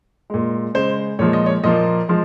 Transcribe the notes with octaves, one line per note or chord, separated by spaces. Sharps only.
A#2 G#3
C#3 G#3 C5
A#2 F3 G#3 C#5
D#5
C#5
A#2 F3 A#3 D#5
F3 G#3